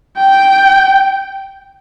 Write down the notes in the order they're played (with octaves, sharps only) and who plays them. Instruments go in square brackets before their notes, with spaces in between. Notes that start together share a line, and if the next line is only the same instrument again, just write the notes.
[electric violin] G5